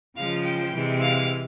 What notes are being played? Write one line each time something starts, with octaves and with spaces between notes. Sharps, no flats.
C#3 F3 G#3 F5
G5
C3 E3 G#3
F5